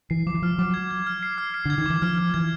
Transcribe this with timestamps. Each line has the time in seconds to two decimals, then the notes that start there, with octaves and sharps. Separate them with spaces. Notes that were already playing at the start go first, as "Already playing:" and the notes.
0.10 E3 C7
0.26 F3 D6
0.34 E3
0.42 F3 F6
0.58 F#3 D6
0.74 G#6
0.91 G#6
1.07 F6
1.23 C7
1.38 F6
1.54 C7
1.65 D3 G#6
1.78 D#3
1.86 E3 D6
2.02 F3 F6
2.18 F6
2.34 E3 G#6